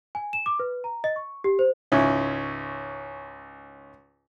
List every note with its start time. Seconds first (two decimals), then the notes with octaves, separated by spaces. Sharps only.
0.15 G#5
0.33 E7
0.46 D6
0.60 B4
0.84 A#5
1.04 D#5
1.16 C#6
1.44 G4
1.59 C5
1.92 C#2 G#2 C#4 E4